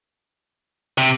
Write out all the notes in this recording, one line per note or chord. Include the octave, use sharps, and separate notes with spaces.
C3